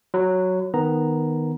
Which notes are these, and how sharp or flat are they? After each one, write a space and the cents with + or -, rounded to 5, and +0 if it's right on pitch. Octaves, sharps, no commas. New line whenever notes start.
F#3 +0 B5 +40
D#3 +0 B3 +0 A#5 +0